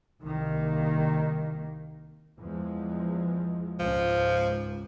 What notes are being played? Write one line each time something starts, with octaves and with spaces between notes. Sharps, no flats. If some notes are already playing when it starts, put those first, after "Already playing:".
C2 D#3 A#3
E2 F3 G#3
C#2 G#2 F3